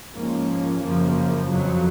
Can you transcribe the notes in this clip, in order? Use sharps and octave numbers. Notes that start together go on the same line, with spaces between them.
G#2 F3 A#3 C#4
F#2 C#3 F3 A#3
F2 C#3 F#3